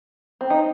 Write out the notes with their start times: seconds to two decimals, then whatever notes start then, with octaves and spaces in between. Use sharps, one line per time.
0.41 C4
0.50 D#4